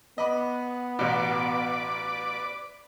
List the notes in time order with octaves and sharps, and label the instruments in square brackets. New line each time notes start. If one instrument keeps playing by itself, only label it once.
[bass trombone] B3 [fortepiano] D#5 B5 D6
[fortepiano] A1 B2 [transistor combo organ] B4 D5 D6